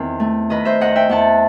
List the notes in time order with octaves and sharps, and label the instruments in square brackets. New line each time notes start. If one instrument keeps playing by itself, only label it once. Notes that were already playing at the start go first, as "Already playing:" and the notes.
Already playing: [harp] E2 D#3 C4
A3
D#3 B4 D#5
C5 E5
E2 D#5 F#5
E5 G5
E2 F#5 A5